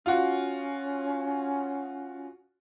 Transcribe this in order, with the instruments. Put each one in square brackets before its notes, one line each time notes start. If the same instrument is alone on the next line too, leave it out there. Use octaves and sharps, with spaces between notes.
[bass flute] C#4 [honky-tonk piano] F4 F#4